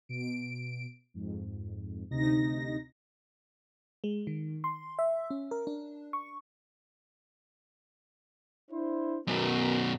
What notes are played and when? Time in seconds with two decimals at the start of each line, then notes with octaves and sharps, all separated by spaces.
0.09 B2 D7
1.14 F2 G#2
2.10 D2 C3 D#4 A#6
4.04 G#3
4.27 D#3
4.64 C6
4.99 E5
5.30 C#4
5.51 A#4
5.67 D4
6.13 C#6
8.71 D4 E4 C5
9.27 F#2 B2 B3 F#4 A#4